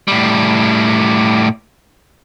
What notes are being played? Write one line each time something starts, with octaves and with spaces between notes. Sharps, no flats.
A2 G3